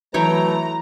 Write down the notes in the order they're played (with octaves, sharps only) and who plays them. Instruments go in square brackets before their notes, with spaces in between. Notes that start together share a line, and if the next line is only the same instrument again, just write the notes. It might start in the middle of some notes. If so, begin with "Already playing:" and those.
[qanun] E3 C#5 G5 [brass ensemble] F#3 A3 B4 [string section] A#5